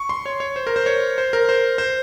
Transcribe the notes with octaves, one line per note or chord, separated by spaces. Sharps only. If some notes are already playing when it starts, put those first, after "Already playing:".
Already playing: C#6
C6
C#5
C#5
C5
A#4
C5
C#5
C5
A#4
C5
C5